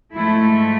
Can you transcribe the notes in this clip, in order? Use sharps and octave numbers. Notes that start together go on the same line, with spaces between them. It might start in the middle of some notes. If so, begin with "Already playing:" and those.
G#2 F3 A3 E4